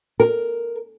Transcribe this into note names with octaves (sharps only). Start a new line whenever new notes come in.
A#4